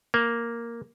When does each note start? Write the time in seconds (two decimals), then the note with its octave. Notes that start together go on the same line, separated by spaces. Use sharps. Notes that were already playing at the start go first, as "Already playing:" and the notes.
0.14 A#3